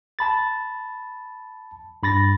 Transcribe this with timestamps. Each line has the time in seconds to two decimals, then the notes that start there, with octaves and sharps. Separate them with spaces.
0.19 A5 B5 A6
2.03 G2 B5 A6 A#6